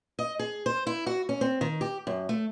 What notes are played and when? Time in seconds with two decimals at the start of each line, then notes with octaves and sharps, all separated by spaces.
0.19 D#5
0.39 G#4
0.66 C5
0.87 E4
1.07 F#4
1.29 C#4
1.41 C4
1.61 D#3
1.81 G4
2.07 F#2
2.29 A3